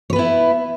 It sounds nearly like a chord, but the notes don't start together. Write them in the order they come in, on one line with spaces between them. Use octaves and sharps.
C#5 B4 B3 E4